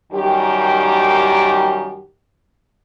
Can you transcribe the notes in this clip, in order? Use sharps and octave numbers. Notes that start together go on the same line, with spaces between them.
F#2 D#3 G3 G4